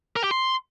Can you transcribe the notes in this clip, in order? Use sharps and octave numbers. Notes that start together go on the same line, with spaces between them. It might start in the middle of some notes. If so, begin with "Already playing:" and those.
A#4
G4
C6